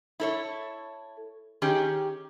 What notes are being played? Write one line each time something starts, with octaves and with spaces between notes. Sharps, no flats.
E4 A4 C#5
D#3 C#4 G4 G#4